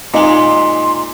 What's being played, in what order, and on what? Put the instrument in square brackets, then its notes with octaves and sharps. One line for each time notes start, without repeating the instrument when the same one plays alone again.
[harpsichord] A#2 G#3 [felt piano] D#4 [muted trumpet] C6